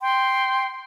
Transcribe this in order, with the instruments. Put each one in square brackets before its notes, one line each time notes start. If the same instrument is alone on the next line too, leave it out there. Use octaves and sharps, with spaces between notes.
[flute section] G5 C6